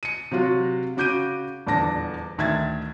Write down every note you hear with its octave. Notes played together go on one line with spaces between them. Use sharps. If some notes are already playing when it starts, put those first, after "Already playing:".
C#7 D#7
C3 F#3 F4 F#4
C#3 F#4 D6 G6 D7 D#7
D#1 E2 D3 A5 A#6
D2 D#3 E5 G#6 A6